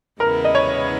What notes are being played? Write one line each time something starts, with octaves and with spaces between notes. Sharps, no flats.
E2 C#3 G#3 B3 E4 A#4
D#5
C#5